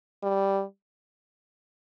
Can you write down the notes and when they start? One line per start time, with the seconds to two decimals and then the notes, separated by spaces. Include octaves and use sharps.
0.23 G3